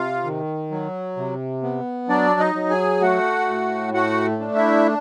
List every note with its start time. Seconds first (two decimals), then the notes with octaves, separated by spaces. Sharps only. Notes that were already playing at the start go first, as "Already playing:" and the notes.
Already playing: C3 F4 F5
0.24 D#3
0.71 F#3
1.17 C3
1.63 B3
2.09 F#3 D4 D5
2.40 D#4 D#5
2.55 F#3
2.70 G#4 G#5
3.01 A3 F#4 F#5
3.48 A2
3.94 A3 F#4 F#5
4.40 D4
4.55 E4 E5